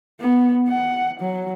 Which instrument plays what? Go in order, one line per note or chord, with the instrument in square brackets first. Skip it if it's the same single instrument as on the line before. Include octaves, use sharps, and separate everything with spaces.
[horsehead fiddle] B3
F#5
F#3